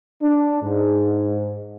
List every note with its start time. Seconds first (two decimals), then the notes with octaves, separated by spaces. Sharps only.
0.22 D4
0.62 G#2